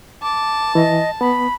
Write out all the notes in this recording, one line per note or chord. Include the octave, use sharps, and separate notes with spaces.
A5 D6
E3 D#5
B3 B5